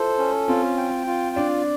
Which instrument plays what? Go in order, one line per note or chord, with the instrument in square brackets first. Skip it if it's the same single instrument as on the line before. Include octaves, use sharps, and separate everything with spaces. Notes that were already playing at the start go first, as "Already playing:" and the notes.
Already playing: [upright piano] E4 F4 [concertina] A4 C5
[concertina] C#4
[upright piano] C4 [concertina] F4
[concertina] G5
F4
[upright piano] D4 [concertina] D5